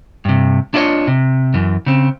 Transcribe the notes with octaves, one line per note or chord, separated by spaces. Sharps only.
G2 C3
D4 E4 F4 G#4 C#5 D#5
C3
F#2 E3
C#3 C4